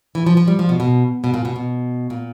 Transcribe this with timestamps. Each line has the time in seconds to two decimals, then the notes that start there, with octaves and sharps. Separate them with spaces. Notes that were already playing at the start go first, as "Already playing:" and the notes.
0.15 E3
0.26 F3
0.37 F3
0.48 G3
0.59 F3
0.69 B2
0.80 B2
1.24 B2
1.34 A#2
1.45 B2
1.56 B2
2.10 A#2